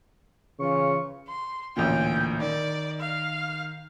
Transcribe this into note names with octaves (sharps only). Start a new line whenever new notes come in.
C#3 E3 F4 C#6
C6
A1 D2 A#2 G5
D#3 D5
F5